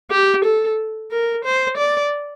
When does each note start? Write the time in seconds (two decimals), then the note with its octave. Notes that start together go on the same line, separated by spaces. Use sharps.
0.11 G4
0.44 A4
1.11 A#4
1.44 C5
1.78 D5